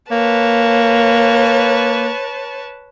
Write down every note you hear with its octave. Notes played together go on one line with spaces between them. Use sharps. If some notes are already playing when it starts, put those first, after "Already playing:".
A#3 B4 C#5 A5